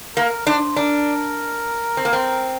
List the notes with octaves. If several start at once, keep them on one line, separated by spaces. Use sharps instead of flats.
A#3 A#4
D4 C5
D4 A#4
C4
A#3
C4